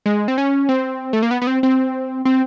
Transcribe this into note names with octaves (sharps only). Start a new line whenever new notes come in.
G#3
C4
C#4
C4
A3
A#3
B3
B3
C4
C4
C4